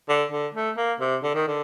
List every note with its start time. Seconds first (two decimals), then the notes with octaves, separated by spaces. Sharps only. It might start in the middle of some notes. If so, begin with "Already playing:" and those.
0.09 D3
0.32 D3
0.55 A3
0.77 A#3
1.00 C3
1.23 D3
1.35 D#3
1.48 D3